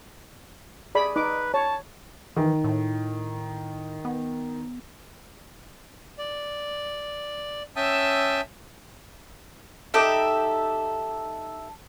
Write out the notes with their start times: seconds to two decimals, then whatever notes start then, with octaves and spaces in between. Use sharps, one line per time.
0.95 G#4 D5 B5
1.16 D#4 B4 D6
1.54 C#5 A5
2.36 D#3 E3
2.64 A2
4.05 B3
6.18 D5
7.76 C#4 E5 G5 A5 D#6 E6
9.94 D#4 G4 A4 E5